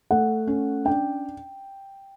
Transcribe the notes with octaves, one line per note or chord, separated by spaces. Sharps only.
A3 F#5
C#4
D4 G5